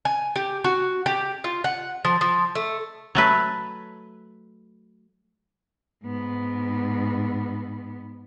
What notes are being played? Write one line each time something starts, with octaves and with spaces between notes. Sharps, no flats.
G#5
G4
F#4
G4
F4
F#5
F3
F3
A3
F#3 A3 B4
G#2 B3